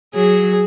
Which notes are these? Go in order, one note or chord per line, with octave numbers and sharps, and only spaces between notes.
F#3 G#4